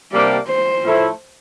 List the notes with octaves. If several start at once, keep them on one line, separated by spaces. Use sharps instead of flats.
C3 G3 A#3 D4 G4 D5
C5
A2 F3 A3 E4 A4